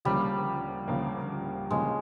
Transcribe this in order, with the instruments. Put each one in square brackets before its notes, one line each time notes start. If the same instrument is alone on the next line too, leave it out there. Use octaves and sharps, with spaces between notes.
[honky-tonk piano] D2 C#3 F3 A#3 [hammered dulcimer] G3
[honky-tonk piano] D2 C#3 F3 A#3
[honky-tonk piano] D2 C#3 F3 A#3 [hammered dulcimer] G#3